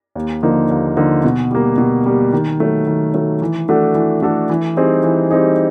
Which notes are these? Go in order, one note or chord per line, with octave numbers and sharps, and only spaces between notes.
D#2
D3 F3 A#3 D#4
D#2
D3 F3 A#3 D#4
B2
G3 A#3
B2
G3 A#3
D#3
F#3 A3
D#3
F#3 A3
E3
A3 D4 F#4 A4
E3
A3 D4 F#4 A4
E3
G3 C4 D#4 G#4
E3
G3 C4 D#4 G#4